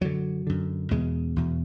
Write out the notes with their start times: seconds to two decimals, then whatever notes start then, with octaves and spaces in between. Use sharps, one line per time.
0.01 F#2 D3 F#3
0.47 F#2 D3
0.91 E2 B2 G#3
1.36 E2 B2